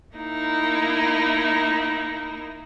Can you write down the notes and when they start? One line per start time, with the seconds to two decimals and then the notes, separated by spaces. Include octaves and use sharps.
0.16 A#3 D#4 E4